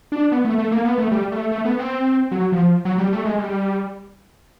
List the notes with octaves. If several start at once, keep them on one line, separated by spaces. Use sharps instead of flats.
D4
B3
A3
A3
A#3
B3
A3
G3
A3
A3
B3
C4
F#3
F3
F#3
G3
A3
G#3
G3